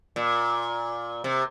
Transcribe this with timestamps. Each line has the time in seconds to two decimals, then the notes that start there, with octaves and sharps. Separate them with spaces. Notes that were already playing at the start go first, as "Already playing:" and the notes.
0.16 A#2
1.24 C3